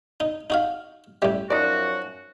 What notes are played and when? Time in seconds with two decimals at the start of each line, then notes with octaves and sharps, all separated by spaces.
0.20 D#4
0.50 D#4 F#4 F5
1.22 A2 G3 C#4 G4 E5
1.50 F#2 F3 D#4 F#4 D5